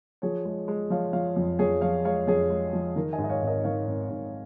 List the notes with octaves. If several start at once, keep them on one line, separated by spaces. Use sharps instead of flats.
F3 G#4 C#5
G#3
G#3
F3 C#5 F5
F3 C#5 F5
F2
F2 G#4 C#5
F3 C#5 F5
G#3 C#5 F5
F2 G#4 C#5
G#3
F3
D#3 A#4
D#5 G#5
G#2
D#5
C#5 F5
G#1
A#4 D#5
D#3 C#5 F5
G#1
G#2